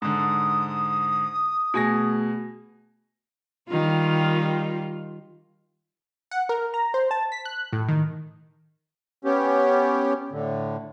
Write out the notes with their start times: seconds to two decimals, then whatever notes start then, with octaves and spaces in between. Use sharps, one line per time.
0.02 G#2 D3 D#6
1.74 B2 A3 G#4 G#5 A#6
3.69 D#3 G3 F4
6.31 F#5
6.49 A#4
6.74 A#5
6.94 C5
7.11 A5
7.32 B6
7.45 F#6
7.73 A2
7.89 D#3
9.25 B3 C#4 G4
10.31 A2 D3